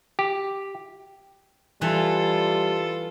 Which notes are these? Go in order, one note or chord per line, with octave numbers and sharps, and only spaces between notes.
G4
E3 G3 F4 A4